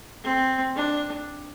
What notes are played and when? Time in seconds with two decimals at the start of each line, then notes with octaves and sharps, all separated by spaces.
0.24 C4
0.76 D4